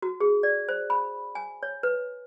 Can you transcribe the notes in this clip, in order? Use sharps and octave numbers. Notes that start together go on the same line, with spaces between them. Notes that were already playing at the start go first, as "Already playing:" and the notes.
F#4
G#4
D5
C5
B5
G#5
C#5
B4